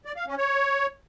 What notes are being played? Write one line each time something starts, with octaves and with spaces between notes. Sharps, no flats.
D5
F5
C#4
C#5